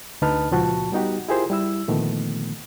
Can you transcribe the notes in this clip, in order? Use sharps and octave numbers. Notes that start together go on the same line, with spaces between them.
D2 D3 D#4 B4 A5 F6
C#2 A#2 F3 F#4 A5 C#6
G3 B3 D#4 F#4 G4
E4 F4 G4 G#4 A#4 C5
G3 E4 E6
A#2 D3 D#3 F3 A3 B3